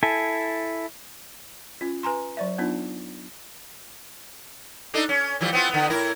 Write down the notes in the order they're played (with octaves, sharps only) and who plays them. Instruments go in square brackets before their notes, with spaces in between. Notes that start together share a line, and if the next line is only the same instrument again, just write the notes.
[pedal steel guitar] E4 A4 G#5
[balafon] C#4 F4
B4 G#5 A#5 C6
F#3 D5 E5
B3 D4 D#4 F4
[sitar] D4 D#4 A4
C#4
E3 F3 G3
B3 C4 F4
D3 B3
A2 E4 A#4